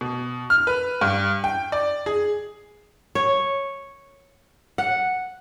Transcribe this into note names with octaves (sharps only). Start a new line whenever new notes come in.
B2
F6
B4
G2
G5
D5
G#4
C#5
F#5